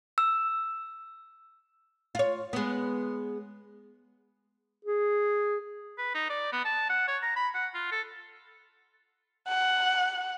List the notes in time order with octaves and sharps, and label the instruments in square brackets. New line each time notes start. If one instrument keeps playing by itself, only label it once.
[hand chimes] E6
[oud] F4 C#5
G#3 B3
[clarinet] G#4
[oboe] B4
D#4
D5
B3
A5
F#5
C#5
A#5
B5
F#5
F4
A4
[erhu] F#5